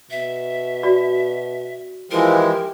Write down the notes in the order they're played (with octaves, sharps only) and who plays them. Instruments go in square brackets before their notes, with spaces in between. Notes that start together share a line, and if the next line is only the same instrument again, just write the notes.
[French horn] B2 [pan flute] E5
[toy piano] F#4 D5
[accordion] E3 F3 G#3 [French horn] G4 [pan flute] A#4